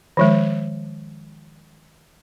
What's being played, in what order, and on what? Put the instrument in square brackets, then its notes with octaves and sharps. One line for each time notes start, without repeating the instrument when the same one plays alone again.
[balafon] D#3 F3 G#3